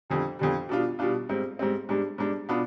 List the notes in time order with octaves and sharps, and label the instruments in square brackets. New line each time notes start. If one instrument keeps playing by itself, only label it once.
[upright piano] F2 D3 G3
F2 D3 G3
B2 G3 D4 F4
B2 G3 D4 F4
G#2 G3 C4
G#2 G3 C4
G#2 G3 D4
G#2 G3 D4
B2 B3 D4 F4